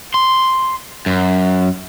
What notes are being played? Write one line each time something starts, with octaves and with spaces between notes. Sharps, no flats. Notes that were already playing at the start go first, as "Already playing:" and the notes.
C6
F#2